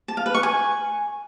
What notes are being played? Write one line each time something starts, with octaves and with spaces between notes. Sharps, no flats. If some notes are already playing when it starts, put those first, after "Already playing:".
A5
F5
B4
C#6
G#5